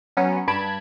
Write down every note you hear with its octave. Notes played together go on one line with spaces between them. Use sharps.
F#3 B3 C#4
G2 A5 B5 G#6 D7